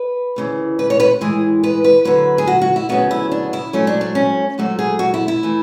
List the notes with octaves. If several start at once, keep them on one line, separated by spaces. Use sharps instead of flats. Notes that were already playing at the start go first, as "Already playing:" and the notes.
Already playing: B4
D2 C#3 E3
B4
C#5
B4
A2 E3 G#3 G#4
B4
B4
F#2 D3 F#3 B4
G#4
F#4
F#4
E4
D2 C#3 F#3 B3 F#4
E4
D4
E4
G#2 F#3 A3 C#4
D4
D4
C#4
G#2 F#3 A3 F#4
G#4
F#4
E4
E4
E3 A3